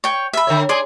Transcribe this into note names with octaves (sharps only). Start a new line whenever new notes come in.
C#5 G5
E5 B5
D3 A#4 C#5
G#4 D5 G#5 C6